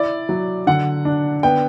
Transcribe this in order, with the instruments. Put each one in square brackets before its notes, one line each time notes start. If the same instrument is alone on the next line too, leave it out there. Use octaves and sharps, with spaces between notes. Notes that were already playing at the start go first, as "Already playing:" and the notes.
Already playing: [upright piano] E4 D5
F#3
D3 F#5
D4
B3 G5